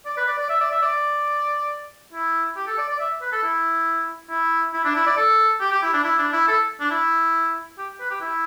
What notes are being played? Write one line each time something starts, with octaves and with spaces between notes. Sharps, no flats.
D5
B4
D5
D5
E5
D5
E5
D5
E4
G4
A4
D5
D5
E5
B4
A4
E4
E4
E4
D4
E4
D5
A4
G4
G4
E4
D4
E4
D4
E4
A4
D4
E4
G4
B4
G4
E4